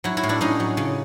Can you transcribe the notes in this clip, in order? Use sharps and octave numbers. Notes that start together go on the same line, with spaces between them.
F#3 E4 F#4
E4 F#4
A2
D4 E4
A2 C#4 D#4
F#3
C#3